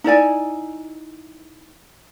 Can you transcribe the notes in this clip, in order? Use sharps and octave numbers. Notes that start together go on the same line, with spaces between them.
D#4 E4 D5 G#5